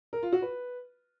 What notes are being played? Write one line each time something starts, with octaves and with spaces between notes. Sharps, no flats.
A#4
F4
F#4
B4